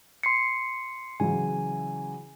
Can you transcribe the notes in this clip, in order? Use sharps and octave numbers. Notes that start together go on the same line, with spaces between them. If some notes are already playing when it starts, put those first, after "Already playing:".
C6 C7 C#7
C#3 E3 F#3 G#5